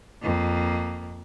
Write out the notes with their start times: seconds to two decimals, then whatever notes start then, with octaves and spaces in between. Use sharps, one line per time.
0.22 F2 A#3